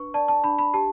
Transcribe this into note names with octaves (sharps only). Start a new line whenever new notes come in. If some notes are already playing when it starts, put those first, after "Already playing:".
Already playing: D4 B4 C#6
D5 A5
A5
D4 B5
B5
G4 A5